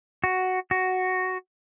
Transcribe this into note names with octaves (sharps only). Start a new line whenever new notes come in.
F#4
F#4